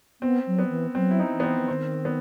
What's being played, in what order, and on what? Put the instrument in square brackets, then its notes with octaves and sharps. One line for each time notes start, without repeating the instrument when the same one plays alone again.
[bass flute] B3 [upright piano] C4
[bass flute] F#3
[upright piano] B3
[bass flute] E3
[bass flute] F#3 [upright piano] C4
[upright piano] E4
D#4
[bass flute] E3
[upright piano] B3
C4
[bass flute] E3
[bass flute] D#3 [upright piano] C4
[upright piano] B3